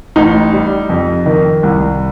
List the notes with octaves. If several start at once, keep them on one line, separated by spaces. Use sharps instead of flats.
A1 D#4
G3
F2
D#3
C2